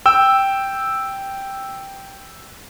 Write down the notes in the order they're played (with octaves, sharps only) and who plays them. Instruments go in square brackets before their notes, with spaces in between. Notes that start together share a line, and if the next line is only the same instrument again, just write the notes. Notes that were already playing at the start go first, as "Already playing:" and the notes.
[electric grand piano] G5 E6